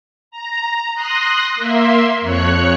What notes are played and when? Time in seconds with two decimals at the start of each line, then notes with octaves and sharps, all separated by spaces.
0.31 A#5
0.94 C6 D#6 F#6 A#6
1.55 A#3 E5 C6
2.21 F2 C#5 F#6 C#7